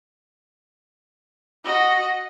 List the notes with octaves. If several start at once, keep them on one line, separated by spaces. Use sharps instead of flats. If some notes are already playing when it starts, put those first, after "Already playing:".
F#4 D#5